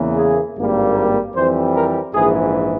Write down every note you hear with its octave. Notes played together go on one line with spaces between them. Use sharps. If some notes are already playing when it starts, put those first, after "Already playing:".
Already playing: E2 C#3 E3 A#3
G#4
G#1 G2 G3 A#3
A#4
F2 E3 G3 C4 C5
A#4
A#1 G#2 E3 G#4